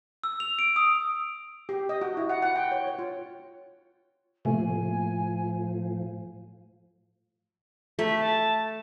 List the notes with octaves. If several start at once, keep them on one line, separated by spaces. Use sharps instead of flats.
E6
F7
D7
D#6
G4
D#5
F#4
E4
F#5
F#5
G5
C#5
C#5
F4
A2 C3 F3 A3 A#3 G#5
A3 B6
A5